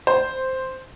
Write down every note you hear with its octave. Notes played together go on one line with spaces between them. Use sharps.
C5